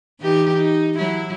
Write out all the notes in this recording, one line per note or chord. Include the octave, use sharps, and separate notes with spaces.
E3 D#4 G4
D#4
F#3 E4